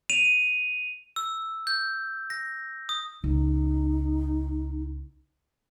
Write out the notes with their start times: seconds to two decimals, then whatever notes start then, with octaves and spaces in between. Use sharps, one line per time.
0.10 D#7 F7
1.16 E6
1.67 G6
2.30 A#6
2.89 D#6
3.24 C#2 D#4